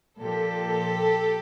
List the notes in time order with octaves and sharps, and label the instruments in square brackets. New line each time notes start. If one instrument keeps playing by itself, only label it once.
[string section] A#2 F3 G4 A4